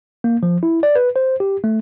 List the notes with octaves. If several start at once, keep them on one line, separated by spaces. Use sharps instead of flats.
A#3
F3
E4
D5
B4
C5
G4
A3